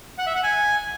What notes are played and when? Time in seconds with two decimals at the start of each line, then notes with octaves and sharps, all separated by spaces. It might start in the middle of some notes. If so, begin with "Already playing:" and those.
0.18 F#5
0.27 E5
0.35 F#5
0.43 G#5